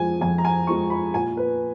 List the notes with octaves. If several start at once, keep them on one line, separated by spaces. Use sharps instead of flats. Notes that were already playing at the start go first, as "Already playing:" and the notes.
Already playing: F2 F3 G#3 G#5
F2 G#5
A#5
G#5
F3 G#3 C#6
B5
A#2 G#5
B4